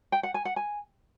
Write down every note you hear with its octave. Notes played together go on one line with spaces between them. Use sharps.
G5
F#5
G#5
F#5
G#5